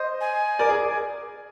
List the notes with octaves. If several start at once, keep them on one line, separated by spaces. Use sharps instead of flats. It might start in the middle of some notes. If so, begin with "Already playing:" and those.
Already playing: C5 D#5
G#5
A#4 D5
G#4